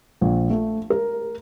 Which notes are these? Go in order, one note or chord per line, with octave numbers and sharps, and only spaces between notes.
A#1
A3
A#4